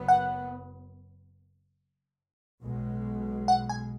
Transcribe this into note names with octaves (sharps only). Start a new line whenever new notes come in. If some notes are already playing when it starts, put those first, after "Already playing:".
Already playing: F#1 F#2 F#3 B3
F#5
B1 B2 G#3
F#5
G#5